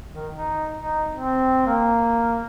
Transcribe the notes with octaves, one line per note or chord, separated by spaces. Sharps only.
D#3
D#4
D#4
C4
A#3